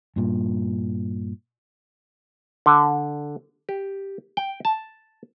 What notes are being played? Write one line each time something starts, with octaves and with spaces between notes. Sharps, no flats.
G2 A#2
D3
G4
G5
A5